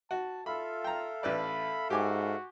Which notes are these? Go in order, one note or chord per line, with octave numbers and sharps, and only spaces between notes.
F#4 A5
F4 A4 E5 F5 B5
G5 A#5
A1 B4 D5 B5
G#2 F#4 G4 G#5 D6